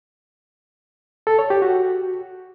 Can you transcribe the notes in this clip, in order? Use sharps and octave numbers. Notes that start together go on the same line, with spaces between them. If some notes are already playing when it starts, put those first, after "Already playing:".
A4
C#5
G4
F#4